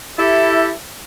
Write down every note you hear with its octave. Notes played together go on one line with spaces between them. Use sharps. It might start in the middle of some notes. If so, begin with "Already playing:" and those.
E4 G4 A4